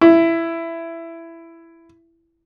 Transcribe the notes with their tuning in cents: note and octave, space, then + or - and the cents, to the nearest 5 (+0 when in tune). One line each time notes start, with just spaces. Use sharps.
E4 +10